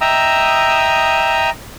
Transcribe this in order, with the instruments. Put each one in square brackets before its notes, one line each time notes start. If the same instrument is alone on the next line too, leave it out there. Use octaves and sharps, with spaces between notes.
[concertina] D#5 E5 G5 A#5 D#6 E6